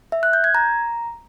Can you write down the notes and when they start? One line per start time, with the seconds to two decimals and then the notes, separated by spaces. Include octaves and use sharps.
0.12 E5
0.23 F#6
0.33 G6
0.44 G#6
0.55 A#5